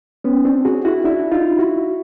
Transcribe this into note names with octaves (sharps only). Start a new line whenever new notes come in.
B3 C#4
C4 D4
F#4 G#4
E4 F#4
D4 E4
D#4 F4
E4 F#4